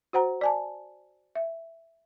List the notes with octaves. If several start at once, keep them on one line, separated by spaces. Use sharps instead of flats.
F#4 C5 F#5 A#5
D5 G#5 A5
E5